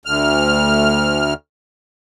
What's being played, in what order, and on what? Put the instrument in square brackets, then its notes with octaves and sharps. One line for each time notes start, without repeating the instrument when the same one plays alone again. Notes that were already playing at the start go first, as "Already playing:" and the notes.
[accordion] D2 F6